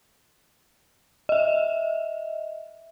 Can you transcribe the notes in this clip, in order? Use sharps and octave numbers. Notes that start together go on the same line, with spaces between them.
D#5 E5